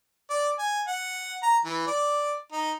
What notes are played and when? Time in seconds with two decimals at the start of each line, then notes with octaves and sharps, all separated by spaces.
0.30 D5
0.59 G#5
0.87 F#5
1.43 A#5
1.65 E3
1.87 D5
2.52 D#4